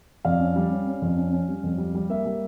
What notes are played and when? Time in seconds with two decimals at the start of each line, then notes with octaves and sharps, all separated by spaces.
0.25 F2 D5 F5
0.40 C#4
0.56 G3
0.71 C#4
0.87 C#4
1.02 F2
1.18 C#4
1.32 C#4
1.48 G3
1.63 F2
1.78 G3
1.95 G3
2.10 A#3 E5
2.26 G3